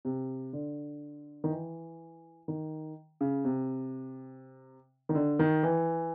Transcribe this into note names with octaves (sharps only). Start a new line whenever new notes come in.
C3
D3
D#3
E3
D#3
C#3
C3
D#3
D3
D#3
E3